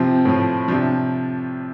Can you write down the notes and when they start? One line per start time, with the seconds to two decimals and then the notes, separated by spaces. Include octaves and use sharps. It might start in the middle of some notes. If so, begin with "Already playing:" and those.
Already playing: C3 F3 C4
0.25 A2 F3
0.68 C3 F3 D4